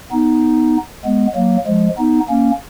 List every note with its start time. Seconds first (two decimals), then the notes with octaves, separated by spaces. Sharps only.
0.12 B3 D#4
1.05 G#3 B3
1.35 F#3 A#3
1.67 F3 G#3
1.98 B3 D#4
2.29 A#3 C#4